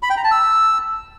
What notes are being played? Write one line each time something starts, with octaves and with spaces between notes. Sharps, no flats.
B5
G5
A#5
A5
E6